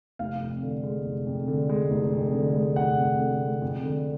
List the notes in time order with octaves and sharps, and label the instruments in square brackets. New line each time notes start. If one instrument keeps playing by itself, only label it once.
[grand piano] F1 F5
F2
D3
G#3
F1
F2
D3
G#3
F1
F2
D3
G#3
F1 F#5
F2
D3
G#3
F2
D3